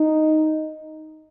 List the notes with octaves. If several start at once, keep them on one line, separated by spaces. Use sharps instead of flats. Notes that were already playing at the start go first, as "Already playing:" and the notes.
Already playing: D#4